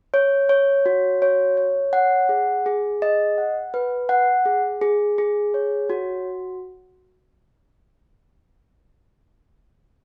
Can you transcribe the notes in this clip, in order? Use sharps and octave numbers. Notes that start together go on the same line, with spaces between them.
C#5
C#5
F#4
C#5
C#5
F#5
G#4
G#4
D#5
F#5
B4
F#5
G#4
G#4
G#4
C#5
F#4